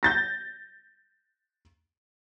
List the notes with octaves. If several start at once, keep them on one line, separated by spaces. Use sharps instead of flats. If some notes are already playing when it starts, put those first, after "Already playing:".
G6 A6 A#6